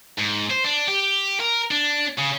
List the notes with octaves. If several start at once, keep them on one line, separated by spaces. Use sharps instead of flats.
G#2
C5
D4
G4
A#4
D4
C#3